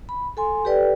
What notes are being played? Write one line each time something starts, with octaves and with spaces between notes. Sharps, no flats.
B5
A4 G#5 C6
G4 A4 B4 D5 G5